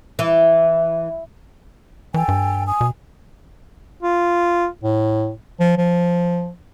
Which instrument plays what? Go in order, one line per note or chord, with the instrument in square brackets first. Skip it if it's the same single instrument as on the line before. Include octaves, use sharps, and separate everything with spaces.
[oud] E3
[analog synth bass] E3 [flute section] A4 G5 G#5
[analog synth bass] G2
[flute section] G#5 D#6
[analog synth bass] B2
[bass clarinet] F4
A2
F3
F3